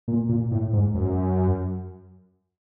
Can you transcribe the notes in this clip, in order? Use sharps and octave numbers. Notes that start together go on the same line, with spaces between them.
A#2
A#2
A2
G#2
F#2